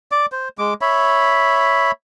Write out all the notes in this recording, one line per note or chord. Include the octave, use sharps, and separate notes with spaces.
D5 D6
C5
G#3 D6
C#5 E5 B5